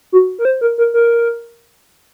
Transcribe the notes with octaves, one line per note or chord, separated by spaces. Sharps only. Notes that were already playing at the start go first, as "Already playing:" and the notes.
F#4
A#4
C5
A#4
A#4
A#4